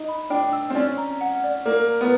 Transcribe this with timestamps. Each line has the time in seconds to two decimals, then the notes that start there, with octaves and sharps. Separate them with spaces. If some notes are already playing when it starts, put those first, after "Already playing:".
Already playing: D#4
0.08 B5
0.30 D4 G5
0.53 E6
0.70 C4
0.75 C#4 D5
0.98 A#5
1.21 F#5
1.44 D5
1.65 A#3 D5
1.88 A#5
2.01 B3